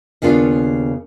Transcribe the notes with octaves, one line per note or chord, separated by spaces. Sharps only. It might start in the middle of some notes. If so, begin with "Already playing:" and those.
D#2 C#3 B3 D4 F4